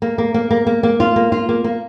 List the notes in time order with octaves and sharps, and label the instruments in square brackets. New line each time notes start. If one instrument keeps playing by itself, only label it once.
[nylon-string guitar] A#3
A#3
A#3
A#3
A#3
A#3
F4
A#3
F4
A#3
A#3